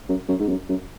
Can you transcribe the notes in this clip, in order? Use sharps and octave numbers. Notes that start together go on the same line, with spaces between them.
F#2
F#2
G#2
F#2
F#2